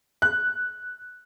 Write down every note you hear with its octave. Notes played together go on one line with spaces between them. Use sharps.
F#6